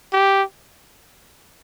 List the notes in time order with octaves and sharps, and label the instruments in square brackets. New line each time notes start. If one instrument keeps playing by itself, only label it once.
[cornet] G4